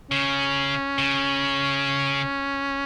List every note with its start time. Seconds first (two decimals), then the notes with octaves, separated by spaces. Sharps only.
0.11 C#3 C#4
0.98 C#3